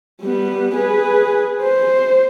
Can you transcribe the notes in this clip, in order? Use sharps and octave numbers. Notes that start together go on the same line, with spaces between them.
G3 B3
G#4 B4
C5